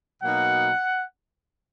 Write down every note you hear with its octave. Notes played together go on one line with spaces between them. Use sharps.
B2 F#3 A#3 D#4 F#5